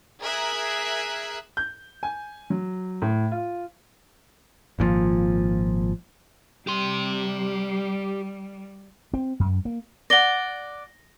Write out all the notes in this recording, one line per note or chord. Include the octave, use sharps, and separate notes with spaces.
G#4 A#4 E5 F#6 G#6
G6
G#5
F#3
A2
F4
G#1 A#2 D#3 F3
G3 G4 C6
C4
F#2
A#3
D5 F#5 A#6 G7